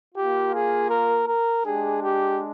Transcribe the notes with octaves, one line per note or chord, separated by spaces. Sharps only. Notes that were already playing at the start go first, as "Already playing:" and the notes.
A#3 F4 G4
G#4
A#4
A#4
G#3 D4 G4 G#4
G4